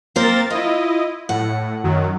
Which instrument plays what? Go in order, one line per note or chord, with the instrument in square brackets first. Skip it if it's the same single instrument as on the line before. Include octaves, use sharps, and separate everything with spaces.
[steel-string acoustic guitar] A#3 C4 C5 [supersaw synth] A#4 A6
[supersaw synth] E4 D#5 [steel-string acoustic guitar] F4
[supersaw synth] A2 [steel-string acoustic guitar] F#5
[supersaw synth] F#2 D#3 F#3